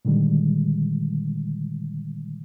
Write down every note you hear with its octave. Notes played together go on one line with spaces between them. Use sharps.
A#2 D3 D#3 G3 G#3